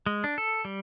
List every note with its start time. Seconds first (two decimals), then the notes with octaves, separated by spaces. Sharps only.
0.06 G#3
0.24 D4
0.38 A4
0.65 G3